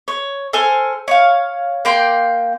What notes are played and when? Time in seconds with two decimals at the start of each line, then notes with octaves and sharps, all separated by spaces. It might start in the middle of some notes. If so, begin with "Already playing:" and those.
0.08 C#5
0.53 A4 C5 G#5 F6
1.08 C#5 F5
1.85 A#3 G5 C6